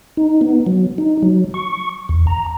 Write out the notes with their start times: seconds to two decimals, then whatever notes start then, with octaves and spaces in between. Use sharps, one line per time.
0.17 D#4
0.41 B3
0.66 F#3
0.98 D#4
1.23 F#3
1.54 C#6
2.09 E2
2.27 A#5